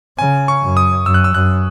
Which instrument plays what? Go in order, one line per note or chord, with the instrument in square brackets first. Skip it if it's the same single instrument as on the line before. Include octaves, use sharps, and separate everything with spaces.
[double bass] C#3 [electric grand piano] G#5
[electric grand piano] C#6
[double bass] F#2
[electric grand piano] D#6
[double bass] F#2 [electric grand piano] E6
[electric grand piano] F#6
E6
[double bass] F#2 [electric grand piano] F#6